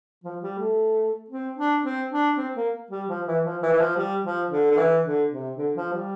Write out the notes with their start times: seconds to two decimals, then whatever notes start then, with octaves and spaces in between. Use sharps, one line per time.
0.24 F3
0.42 G3
0.59 A3
1.30 C4
1.57 D4
1.84 C4
2.11 D4
2.37 C4
2.56 A#3
2.91 G3
3.09 F3
3.27 E3
3.45 F3
3.62 E3
3.73 E3
3.80 F3
3.97 G3
4.23 F3
4.51 D3
4.71 D3
4.78 E3
5.05 D3
5.31 C3
5.57 D3
5.76 F3
5.93 G3